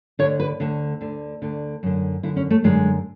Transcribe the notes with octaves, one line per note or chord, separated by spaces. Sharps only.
D2 D3 C#5
B4
D2 D3
D2 D3
D2 D3
F#2 D3
F#2 D3 E4
C#4
A3
F#2 D3 G#3